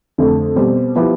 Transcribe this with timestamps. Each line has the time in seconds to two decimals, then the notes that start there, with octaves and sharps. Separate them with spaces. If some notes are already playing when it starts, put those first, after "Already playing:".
0.18 F2 D3 A3
0.56 B2 G3 C4
0.95 F3 B3 E4 G4